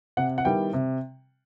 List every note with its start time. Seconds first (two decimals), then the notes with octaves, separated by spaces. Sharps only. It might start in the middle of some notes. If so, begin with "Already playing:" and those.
0.17 C3 F#5
0.38 F#5
0.45 D#3 G3 B3 E4 G5
0.73 C3